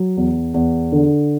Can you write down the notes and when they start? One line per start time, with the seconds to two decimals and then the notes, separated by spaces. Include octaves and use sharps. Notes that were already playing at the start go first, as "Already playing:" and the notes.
Already playing: F#3
0.17 E2
0.54 E2
0.92 D3